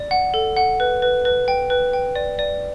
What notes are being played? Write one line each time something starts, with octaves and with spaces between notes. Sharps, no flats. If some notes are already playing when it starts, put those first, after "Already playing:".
Already playing: D5
F#5
A4
F#5
B4
B4
B4
G5
B4
G5
D5
D5